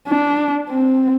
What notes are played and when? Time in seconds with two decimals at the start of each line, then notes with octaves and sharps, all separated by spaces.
0.08 D4
0.69 C4